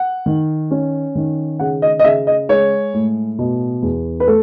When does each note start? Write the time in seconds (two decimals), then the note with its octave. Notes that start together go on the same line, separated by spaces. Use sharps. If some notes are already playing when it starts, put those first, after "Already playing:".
Already playing: F#5
0.26 D#3
0.71 C#4
1.15 D#3
1.59 C#3 F#5
1.82 D#5
1.99 D#5
2.04 C#3 E5
2.27 D#5
2.49 G#3 C#5
2.94 A2
3.39 B2
3.82 E2
4.20 B4
4.28 A3 A4